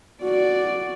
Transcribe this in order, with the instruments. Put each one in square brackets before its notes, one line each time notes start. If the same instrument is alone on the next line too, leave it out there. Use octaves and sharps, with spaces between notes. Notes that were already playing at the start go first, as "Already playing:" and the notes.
[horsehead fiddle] F#4 D5